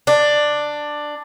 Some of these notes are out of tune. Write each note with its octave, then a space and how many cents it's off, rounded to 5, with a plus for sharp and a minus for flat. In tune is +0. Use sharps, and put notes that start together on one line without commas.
D4 +10